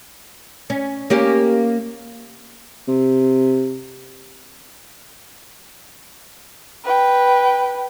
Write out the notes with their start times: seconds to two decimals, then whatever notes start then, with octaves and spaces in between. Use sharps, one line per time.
0.70 C#4
1.10 A#3 C#4 G4
2.88 C3
6.84 B4 G5